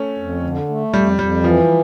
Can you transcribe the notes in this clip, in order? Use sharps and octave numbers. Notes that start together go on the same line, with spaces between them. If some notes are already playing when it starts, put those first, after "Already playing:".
Already playing: A3 C#4
F2
D3
A3
F2 G3
F2 G3
E3 F3